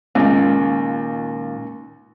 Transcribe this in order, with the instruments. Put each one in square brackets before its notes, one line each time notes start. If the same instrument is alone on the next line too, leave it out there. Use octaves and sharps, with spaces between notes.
[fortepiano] C#2 [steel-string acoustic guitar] A#2 D#3